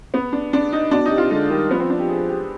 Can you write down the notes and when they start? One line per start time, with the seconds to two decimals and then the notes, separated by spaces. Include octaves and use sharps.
0.14 B3
0.33 D4
0.53 D4
0.73 D#4
0.91 B2 D4
1.06 D#4
1.11 C3
1.18 F4
1.31 D3 G#3
1.50 D#3 G3
1.71 F3 B3
1.80 C4
1.90 D4
1.99 G4
2.09 G#4
2.29 G4